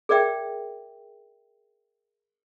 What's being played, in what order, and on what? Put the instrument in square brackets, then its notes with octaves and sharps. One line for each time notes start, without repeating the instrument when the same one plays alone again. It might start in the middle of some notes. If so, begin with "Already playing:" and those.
[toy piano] G#4 A#4 D5 E5 G5